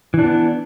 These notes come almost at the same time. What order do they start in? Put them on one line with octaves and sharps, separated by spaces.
E3 D4 B3